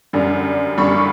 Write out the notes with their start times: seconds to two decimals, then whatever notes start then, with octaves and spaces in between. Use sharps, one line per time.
0.13 F#2 D3 G3
0.78 F#2 D3 G3 B5 C#6